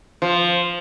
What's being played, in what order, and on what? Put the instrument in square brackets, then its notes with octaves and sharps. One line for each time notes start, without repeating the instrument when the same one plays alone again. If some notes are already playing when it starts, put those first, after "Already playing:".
[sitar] F3